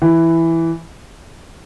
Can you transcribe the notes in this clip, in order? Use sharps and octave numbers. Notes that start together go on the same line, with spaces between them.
E3